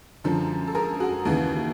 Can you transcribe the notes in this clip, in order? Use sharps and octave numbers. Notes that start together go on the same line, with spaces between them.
F#2 D3 F3
A4
G#4 A#4
F#4 G#4
D#2 C#3 E3